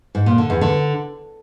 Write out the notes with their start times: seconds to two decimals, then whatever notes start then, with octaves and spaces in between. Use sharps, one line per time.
0.15 G#2
0.26 A#2
0.38 D3
0.50 E2
0.61 D3